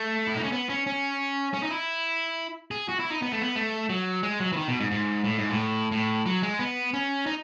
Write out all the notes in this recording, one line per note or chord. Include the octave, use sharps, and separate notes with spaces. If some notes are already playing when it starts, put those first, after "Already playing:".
Already playing: A3
E4
D#4
C#4
B3
C#4
C#4
C#4
D#4
E4
G#4
F#4
E4
D#4
B3
A3
B3
A3
F#3
G#3
F#3
E3
D#3
B2
G#2
G#2
A2
G#2
A2
A2
F#3
G#3
B3
C#4
D#4